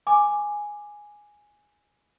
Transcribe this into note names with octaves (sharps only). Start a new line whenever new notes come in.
G#5 D6